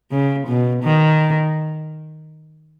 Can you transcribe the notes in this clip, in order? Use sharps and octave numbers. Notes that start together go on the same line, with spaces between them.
C#3
B2
D#3